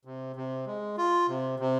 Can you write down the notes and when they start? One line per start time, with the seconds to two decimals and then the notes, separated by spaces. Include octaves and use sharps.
0.05 C3
0.36 C3
0.67 G#3
0.98 F4
1.28 C3
1.59 C3